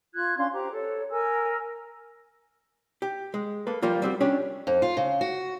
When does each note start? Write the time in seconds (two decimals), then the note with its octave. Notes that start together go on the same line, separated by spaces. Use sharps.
0.13 F4 F#6 G#6
0.37 C#4 D4 F5 C6
0.53 G4 C5 A#5 D6
0.72 A4 C#5
1.11 A#4 G#5 E6
3.02 G4
3.34 G#3
3.67 A#3 A4 B4
3.83 F3 G3 A#3 F4
4.02 G3 C4 F#4
4.21 C#4 D4 G4 C#5
4.67 F2
4.82 F4
4.97 C#3
5.21 F#4